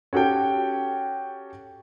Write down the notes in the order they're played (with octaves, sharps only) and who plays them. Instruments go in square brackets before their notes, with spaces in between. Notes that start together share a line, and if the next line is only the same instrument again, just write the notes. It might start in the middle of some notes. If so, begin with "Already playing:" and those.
[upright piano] C#4 F#4 G4 A4 G5